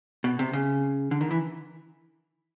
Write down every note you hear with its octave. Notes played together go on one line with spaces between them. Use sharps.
B2
C3
C#3
D3
D#3
E3